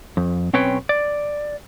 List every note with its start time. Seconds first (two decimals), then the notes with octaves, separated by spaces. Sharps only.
0.17 F2
0.53 B1 C4 C#4 B4 C#5 G5
0.89 D5